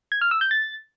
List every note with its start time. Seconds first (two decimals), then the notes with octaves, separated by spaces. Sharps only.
0.12 G#6
0.21 F6
0.31 E6
0.41 G6
0.51 A6